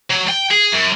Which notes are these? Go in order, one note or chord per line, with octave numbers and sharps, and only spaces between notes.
F#3
G5
G#4
F#2